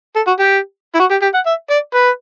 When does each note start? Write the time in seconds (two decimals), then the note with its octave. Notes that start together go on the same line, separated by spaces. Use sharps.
0.15 A4
0.27 F#4
0.39 G4
0.94 E4
0.99 F#4
1.10 G4
1.22 G4
1.34 F#5
1.46 E5
1.70 D5
1.94 B4